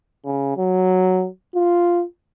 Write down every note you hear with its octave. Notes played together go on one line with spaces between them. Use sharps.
C#3
F#3
F4